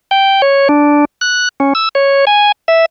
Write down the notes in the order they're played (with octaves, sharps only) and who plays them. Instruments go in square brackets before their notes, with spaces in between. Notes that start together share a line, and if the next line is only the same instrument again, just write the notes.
[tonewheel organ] G5
C#5
D4
F#6
C#4
E6
C#5
G#5
E5